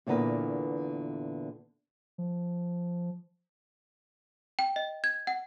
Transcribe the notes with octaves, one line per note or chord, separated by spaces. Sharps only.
E2 A#2 D3 B3 A#4 B4
F3
G5
D#5
G#6
F#5